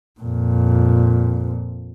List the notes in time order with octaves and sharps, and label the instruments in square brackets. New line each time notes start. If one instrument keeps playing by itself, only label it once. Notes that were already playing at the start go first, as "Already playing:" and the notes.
[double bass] F2 A#2